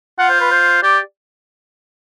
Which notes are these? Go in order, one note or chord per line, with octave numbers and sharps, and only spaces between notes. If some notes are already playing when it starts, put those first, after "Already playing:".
F4 F#5
C5
B4
C5
G4 D5